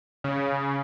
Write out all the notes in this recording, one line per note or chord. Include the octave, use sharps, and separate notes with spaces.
C#3